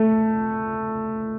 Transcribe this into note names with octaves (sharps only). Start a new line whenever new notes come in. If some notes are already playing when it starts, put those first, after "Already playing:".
Already playing: A3